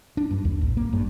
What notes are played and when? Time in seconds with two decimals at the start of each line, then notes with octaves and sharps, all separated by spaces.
0.17 D4
0.31 G2
0.45 D#2
0.61 A1
0.77 A#3
0.93 G2